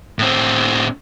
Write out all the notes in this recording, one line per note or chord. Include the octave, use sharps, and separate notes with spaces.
A2 C4